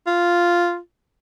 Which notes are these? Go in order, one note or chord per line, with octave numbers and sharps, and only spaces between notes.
F4